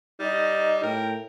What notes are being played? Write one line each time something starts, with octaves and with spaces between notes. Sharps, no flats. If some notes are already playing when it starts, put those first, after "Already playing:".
G3 D#4 D#5
A2 A#4 G5